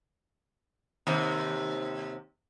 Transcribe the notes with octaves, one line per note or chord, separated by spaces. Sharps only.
D#2 C3